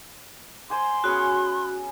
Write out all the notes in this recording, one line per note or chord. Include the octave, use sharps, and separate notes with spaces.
C5 G#5 C6 D6
B3 C#4 F#4 G#4